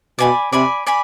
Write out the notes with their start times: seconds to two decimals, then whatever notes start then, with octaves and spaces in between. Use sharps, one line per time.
0.19 B2 D5 G#5 B5
0.53 C3 D5 G#5 B5
0.87 D5 G#5 B5